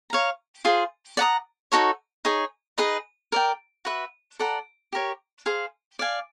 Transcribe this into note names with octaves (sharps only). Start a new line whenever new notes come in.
C#5 F5 A#5
F4 G#4 C5
D5 F#5 A#5 D#6
D#4 F#4 A4 C#5
D#4 G#4 C#5
D#4 G#4 B4 D#5
A#4 D5 G5
F#4 B4 E5
A4 D5 F#5 A#5
G4 A#4 C#5
G#4 C5 F5
D5 F5 G#5